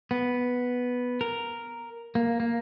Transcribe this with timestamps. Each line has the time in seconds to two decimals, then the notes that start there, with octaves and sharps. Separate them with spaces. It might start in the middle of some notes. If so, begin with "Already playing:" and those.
0.11 B3
1.21 A#4
2.15 A#3
2.40 A#3